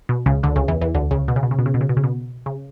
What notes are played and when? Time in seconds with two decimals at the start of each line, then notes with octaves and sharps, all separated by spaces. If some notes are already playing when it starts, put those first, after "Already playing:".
0.09 B2
0.26 C#2 C#3
0.43 D2 D3
0.56 C#2 C#3
0.68 E2 E3
0.81 E2 E3
0.95 D2 D3
1.11 C#2 C#3
1.28 B2
1.36 C#3
1.43 B2
1.51 C#3
1.59 B2
1.66 C#3
1.74 B2
1.81 C#3
1.89 B2
1.97 C#3
2.04 B2
2.46 C#3